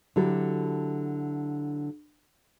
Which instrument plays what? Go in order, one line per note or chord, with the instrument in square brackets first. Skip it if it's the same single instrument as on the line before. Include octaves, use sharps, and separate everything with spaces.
[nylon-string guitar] D3 F#3 E4 F#4 G4 A4